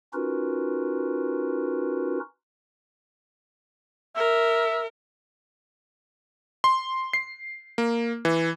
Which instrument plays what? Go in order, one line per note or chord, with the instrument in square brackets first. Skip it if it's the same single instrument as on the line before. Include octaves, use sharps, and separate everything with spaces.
[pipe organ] C#4 D#4 F4 F#4 A#4 B4
[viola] A#4 [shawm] E5
[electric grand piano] C6
C7
A#3
E3